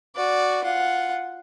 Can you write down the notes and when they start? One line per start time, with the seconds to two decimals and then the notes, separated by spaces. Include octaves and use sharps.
0.16 F#4 D5
0.64 F4 F#5